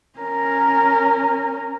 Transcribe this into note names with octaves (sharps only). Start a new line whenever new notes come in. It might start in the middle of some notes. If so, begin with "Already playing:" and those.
C#4 A#4